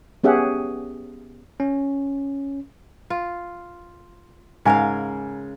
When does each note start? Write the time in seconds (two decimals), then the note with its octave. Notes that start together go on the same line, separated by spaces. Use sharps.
0.24 B3 C#4 G4 G#4 E5 F#5
1.60 C#4
3.10 F4
4.65 G#2 C#3 A#4 F5 G#5